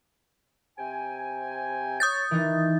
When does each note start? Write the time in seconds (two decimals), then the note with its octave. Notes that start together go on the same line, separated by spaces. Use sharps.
0.78 C3 G5 G#5
2.00 C#5 D#6 G6 A6
2.31 D#3 E3 D#4